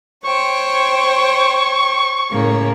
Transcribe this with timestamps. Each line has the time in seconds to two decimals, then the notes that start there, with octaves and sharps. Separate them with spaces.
0.25 C5 C#5 G5 C#6
2.31 A2 C#3 A#3